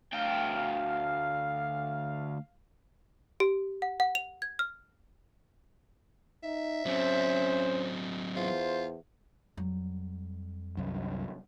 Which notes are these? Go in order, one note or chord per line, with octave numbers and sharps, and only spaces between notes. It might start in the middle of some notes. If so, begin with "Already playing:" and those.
D2 F5 G5
G4
F#5
F#5
F7
G#6
F6
D#4 E5
F#3 C4 C#4 C5
E2 F4 C5
F2 F#3 G3
C2 F#2